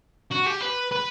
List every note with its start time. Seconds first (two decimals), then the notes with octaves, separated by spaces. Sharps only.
0.31 F#4
0.46 G4
0.61 B4
0.91 B4